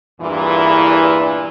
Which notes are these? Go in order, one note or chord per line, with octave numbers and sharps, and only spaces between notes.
E2 G2 A#2 E3